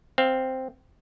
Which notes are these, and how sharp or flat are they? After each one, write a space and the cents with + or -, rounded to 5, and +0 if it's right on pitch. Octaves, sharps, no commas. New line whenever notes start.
C4 +0 F5 +0